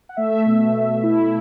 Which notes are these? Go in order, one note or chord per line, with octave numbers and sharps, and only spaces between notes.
F#5
A3 E5
B2
B2
E4